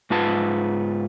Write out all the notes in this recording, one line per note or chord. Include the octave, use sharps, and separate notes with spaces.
G#2 F4 B4 A5